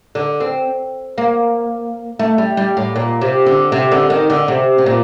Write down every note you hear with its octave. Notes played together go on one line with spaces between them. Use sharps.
D3
C4
A#3
A3
G3
G3
A2
A#2
C3
D3
C3
D3
D#3
D3
C3
C3
A#2